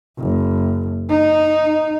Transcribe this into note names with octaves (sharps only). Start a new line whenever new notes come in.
F#1
D#4